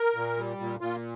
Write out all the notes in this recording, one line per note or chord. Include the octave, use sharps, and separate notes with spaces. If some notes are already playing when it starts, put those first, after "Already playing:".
Already playing: A#4
A#2
G3
A#2
A#2 F4